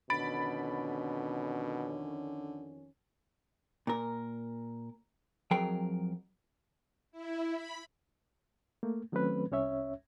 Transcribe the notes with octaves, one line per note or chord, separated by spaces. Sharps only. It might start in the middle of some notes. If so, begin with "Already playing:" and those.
F2 B2 D3 D#3 C#4 B5 A6 D7
A#2 A#4
F2 F#3 G#4 A#4 G5
E4
B5
A3 A#3
D#3 F#3 A3 C4 C#4 B4
C2 C#4 C#5 E5